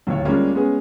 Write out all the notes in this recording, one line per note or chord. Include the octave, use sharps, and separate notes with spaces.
D1 D#2 C#5
G3 G#3 A#3 C#4 D4 F4
G#3 B3 C#4 G#4